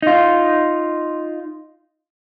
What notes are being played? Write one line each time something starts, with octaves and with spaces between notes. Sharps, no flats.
D#4 F4